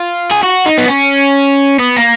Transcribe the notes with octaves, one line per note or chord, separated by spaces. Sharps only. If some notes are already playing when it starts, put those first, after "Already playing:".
Already playing: F4
G#4
F#4
D#4
B3
C#4
B3
A#3